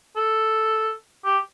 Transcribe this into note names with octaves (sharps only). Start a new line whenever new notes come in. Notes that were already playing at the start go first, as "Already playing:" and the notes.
A4
G4